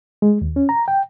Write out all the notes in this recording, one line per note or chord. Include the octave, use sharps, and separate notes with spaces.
G#3
D#2
C#4
A#5
G5